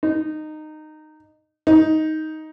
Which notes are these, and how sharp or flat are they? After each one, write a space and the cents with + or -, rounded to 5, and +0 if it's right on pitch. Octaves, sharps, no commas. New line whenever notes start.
D#4 -15
D#4 +10